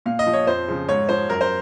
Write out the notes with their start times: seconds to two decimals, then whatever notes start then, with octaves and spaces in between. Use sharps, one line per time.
0.06 A#2 F5
0.19 D#5
0.27 F3
0.33 C#5
0.47 F2 C5
0.68 C#3 F3
0.88 G#2 C#5
1.09 F3 C5
1.29 F#2 A#4
1.41 C5